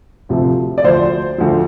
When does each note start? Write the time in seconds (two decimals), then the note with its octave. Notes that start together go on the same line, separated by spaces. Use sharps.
0.29 D2 C3 F3
0.78 D5
0.84 D2 D3 F3 C5
1.38 D2 D3 F3